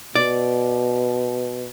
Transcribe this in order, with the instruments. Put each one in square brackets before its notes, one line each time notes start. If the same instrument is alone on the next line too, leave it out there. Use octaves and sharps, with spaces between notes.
[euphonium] B2 [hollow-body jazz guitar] D5